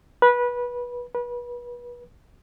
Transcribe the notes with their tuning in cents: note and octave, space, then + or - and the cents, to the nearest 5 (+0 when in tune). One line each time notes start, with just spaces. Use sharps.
B4 -20
B4 -30